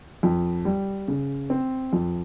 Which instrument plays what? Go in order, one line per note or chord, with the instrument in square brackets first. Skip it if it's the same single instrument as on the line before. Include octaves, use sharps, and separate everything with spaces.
[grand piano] F2
G3
C#3
C4
F2